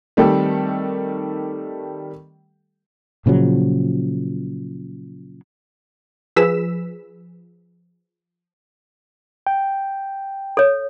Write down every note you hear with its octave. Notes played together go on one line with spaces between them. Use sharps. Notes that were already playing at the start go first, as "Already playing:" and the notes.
D#3 G3 A3 C4 G4 A4
A#2 C#3 F3 F#3
F3 G#4 B4 E6 B6 E7
G5
A4 C#5